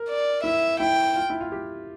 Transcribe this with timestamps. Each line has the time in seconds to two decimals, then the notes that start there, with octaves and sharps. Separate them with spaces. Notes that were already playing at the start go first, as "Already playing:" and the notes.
Already playing: A#4
0.08 D5
0.44 E4 E5
0.80 E4 G5
1.16 F4
1.30 E4
1.41 F4
1.52 G4